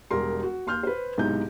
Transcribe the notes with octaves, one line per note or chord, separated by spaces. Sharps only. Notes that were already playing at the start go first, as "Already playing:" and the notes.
E1 G3 A#4 C6
F#4
D#2 C6 F6 G6
B4 C5
B1 G#2 C3 D#4 E4 G6